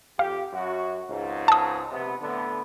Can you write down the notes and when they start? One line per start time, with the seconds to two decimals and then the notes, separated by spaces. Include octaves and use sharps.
0.19 F2 G4 F5
0.53 F#2 F#4
1.09 G#1 C#2 G#2
1.48 A5 D#6
1.92 A#1 C3 B3
2.22 A2 D3 B3